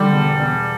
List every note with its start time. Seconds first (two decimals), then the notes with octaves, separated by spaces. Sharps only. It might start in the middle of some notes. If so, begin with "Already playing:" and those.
Already playing: D3 G3
0.12 E1
0.39 E1